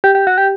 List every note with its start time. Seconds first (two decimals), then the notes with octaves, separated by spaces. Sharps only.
0.04 G4
0.15 G4
0.27 F#4
0.38 G4